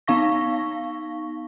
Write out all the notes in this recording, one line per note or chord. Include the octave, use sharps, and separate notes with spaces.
B3 D#4 F5 C#6 A#6